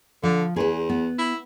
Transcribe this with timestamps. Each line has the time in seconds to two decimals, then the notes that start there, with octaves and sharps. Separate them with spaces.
0.23 D3 F3
0.56 E2 G#4 B4
0.89 B3
1.19 E4